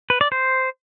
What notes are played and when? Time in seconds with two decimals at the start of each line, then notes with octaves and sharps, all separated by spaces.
0.10 B4
0.21 D5
0.32 C5